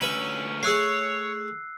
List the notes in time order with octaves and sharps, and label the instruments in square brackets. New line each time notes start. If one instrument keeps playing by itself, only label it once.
[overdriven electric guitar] D2 C#4 [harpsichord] B4 E5 B5
[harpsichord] A3 G#4 [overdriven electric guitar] C#5 [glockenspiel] E6 F#6 C7